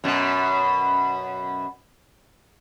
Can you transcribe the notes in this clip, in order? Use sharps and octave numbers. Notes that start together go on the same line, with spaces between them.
F#2 B2